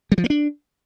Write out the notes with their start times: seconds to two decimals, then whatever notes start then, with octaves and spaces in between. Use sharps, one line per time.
0.12 G3
0.18 F3
0.24 A#3
0.30 D4